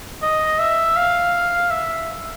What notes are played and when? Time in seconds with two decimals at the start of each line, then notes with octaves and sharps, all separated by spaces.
0.22 D#5
0.59 E5
0.96 F5
1.71 E5